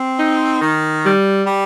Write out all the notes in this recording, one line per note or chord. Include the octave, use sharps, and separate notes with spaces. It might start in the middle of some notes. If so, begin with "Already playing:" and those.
Already playing: C4
D#4
D#3
G3
G3